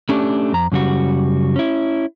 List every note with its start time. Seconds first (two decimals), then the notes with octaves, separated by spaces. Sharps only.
0.09 A3 C#4 D4 G4
0.53 F2 A#5
0.72 F#2 C#3 G3 F#4
1.56 C#4 E4